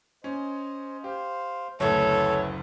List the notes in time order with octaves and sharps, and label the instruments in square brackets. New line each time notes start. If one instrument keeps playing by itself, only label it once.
[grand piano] C#4 [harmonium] C5 D#5
[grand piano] G4 [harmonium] C5 F5
[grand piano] F#1 D2 [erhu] A4 [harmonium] B4 E5 [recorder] C#5